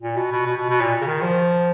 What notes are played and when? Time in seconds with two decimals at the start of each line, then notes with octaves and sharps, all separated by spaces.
0.02 A#2
0.17 B2
0.31 B2
0.46 B2
0.57 B2
0.70 B2
0.81 A#2
1.02 C#3
1.07 D#3
1.22 F3